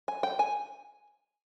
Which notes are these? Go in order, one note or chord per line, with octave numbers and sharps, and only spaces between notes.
G#5
G5
G#5